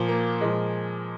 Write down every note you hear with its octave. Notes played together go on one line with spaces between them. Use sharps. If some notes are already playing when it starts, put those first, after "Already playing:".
Already playing: A#2 F3
A#3
A#2 F3 G#3